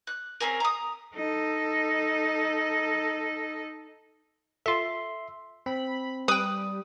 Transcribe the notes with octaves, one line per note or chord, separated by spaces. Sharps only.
F#6
C4 C#4 G#4 A#4
A#5 D#6
D#4 A4
F4 A4 E5 C6
C4 B5
G3 B4 G5 D#6